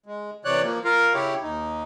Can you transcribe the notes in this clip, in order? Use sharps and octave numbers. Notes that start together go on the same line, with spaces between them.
G#3
C3 E3 C#5 D5 F#6
F3 A#3
F4 A#4 F5
C#3 E4 G4 C#5
D#2 D#4